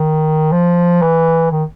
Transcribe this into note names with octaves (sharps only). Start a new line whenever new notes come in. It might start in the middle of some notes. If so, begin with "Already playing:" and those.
Already playing: D#3
F3
E3
D#3